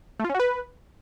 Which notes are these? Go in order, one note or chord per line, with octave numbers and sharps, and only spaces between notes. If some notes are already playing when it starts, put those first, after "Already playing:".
A3
F4
C#4
F#4
B4